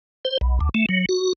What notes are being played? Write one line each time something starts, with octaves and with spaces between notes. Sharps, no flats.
C5
B1
D2
A3
F#3
F#4